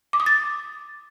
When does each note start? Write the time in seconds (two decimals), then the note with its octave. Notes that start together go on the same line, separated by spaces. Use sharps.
0.13 D6
0.20 D#6
0.26 A6